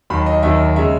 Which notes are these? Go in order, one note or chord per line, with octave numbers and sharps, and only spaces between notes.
D#2 D#3 F#3 B5
D#5
D#2 D#3 F#3 E5
C#3 G#3 E5